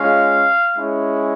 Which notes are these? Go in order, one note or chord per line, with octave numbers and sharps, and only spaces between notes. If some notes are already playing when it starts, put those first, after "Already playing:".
Already playing: G#3 C#4 F4 F5
G#3 C#4 E4